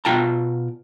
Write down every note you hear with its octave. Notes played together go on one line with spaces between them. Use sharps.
B2 F4 G5 A5 A#5